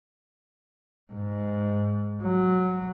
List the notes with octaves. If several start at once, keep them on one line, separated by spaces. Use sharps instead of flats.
G#2
F#3